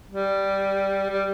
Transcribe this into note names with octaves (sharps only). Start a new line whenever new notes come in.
G3
G3